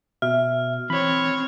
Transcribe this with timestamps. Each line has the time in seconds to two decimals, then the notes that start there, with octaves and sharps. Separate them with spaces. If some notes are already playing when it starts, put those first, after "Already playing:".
0.22 B2 E5 F6
0.90 E3 C4 C#5 B5